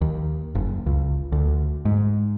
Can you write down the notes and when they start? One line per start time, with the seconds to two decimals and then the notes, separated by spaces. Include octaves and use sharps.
0.01 D#2
0.55 F#1
0.86 C#2
1.32 D2
1.85 G#2